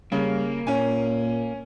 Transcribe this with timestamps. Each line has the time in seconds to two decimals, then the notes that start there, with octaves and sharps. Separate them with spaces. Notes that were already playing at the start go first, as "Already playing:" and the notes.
0.12 C#3 G3 A#3
0.67 A#2 C#4 G#5